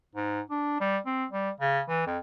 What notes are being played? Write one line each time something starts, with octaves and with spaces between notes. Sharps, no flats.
G#2
D4
G3
C4
G3
C#3
E3
F2